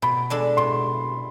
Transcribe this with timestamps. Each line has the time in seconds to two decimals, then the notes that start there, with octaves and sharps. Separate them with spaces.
0.02 B2 B5
0.30 G#3 D4 A4
0.57 B2 C6